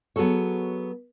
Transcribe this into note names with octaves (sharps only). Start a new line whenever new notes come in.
F#3 B3 F#4 G#4 A4 C#5